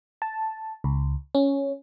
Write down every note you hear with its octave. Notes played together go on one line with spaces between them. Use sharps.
A5
C#2
C#4